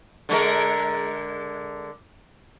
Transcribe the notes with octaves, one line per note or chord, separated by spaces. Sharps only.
D3 G#3 A#4